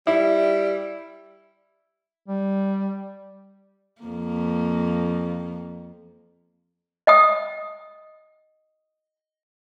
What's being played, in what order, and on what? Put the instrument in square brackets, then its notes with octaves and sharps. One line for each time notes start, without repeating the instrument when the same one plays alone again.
[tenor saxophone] G3 [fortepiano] E4
[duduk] G3
[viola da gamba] F2 A#3
[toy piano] D#5 G5 D#6